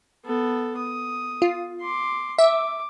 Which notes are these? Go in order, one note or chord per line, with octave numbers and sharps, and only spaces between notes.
B3 A4
D#6
F4
C6 D6
E5 D6